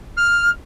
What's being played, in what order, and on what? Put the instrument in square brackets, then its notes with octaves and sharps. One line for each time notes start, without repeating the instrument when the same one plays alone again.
[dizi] F6